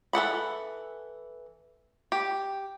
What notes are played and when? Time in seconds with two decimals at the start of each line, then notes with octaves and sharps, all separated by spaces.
0.13 E3 A4 F#5 B5
2.12 G4